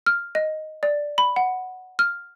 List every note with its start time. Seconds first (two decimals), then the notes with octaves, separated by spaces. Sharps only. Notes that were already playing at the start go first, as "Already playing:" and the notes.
0.06 F6
0.35 D#5
0.83 D5
1.18 B5
1.36 F#5
1.99 F6